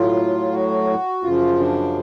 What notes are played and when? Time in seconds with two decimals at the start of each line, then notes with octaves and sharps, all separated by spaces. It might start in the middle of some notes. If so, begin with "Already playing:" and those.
Already playing: A2 F#3 F4
0.52 F#4
1.24 F#2 C#3 F3 F4
1.59 D4